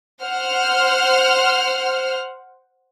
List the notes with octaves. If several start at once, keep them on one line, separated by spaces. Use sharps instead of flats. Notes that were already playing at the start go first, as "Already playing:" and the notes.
C5 F#5 F6